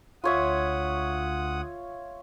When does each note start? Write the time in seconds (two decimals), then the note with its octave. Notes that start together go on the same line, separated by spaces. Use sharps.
0.24 D2 F4 C#5 E5 F#5 D#6